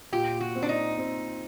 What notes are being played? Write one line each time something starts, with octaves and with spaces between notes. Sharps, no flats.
A#2 G4
F#4
C4
D4
D#4
C4